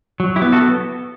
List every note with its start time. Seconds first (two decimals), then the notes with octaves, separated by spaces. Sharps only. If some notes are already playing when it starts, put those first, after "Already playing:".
0.20 F#3
0.36 E4 G4
0.42 B3
0.52 F#4 A4